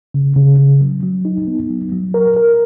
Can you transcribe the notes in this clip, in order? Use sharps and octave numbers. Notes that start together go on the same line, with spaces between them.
C#3
C#3
C#3
F#3
F#3
D#4
B3
F#3
F#3
A#4
A#4